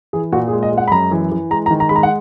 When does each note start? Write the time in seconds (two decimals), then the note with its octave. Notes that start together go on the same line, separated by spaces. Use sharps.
0.13 E3 G#4
0.32 A#2 F#4
0.48 G#4
0.53 G#3
0.63 D#5
0.72 G#3
0.78 F#5
0.88 B5
0.91 F#2 A#5
1.11 E3
1.32 E3
1.51 G#3 A#5
1.66 A#5
1.71 D#3
1.80 A#5
1.89 G#3 B5
1.96 A#5
2.03 F#5